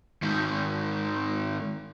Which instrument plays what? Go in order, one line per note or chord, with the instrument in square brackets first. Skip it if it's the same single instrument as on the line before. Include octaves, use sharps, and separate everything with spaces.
[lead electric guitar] G#2 D#3